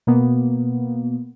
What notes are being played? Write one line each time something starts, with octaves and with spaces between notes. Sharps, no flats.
B2 A#3 B3